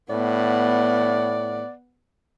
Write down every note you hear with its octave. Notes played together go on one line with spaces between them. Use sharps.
A2 B3 D5 F#5